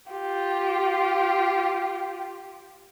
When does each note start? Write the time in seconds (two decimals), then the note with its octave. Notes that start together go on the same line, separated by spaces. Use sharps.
0.12 F4 G4